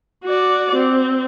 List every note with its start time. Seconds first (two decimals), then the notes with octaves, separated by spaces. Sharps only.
0.24 F#4 D5
0.76 C4